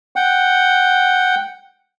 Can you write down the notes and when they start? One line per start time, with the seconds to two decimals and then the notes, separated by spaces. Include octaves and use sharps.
0.16 F#5 G5